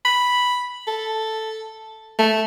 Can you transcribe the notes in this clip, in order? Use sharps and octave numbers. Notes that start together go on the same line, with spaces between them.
B5
A4
A3